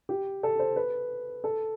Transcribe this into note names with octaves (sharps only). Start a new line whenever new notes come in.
G4
A4
C5
B4
A4